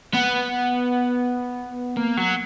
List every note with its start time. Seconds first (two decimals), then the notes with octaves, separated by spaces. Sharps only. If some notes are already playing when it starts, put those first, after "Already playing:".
0.14 B3
1.97 A#3
2.17 F#3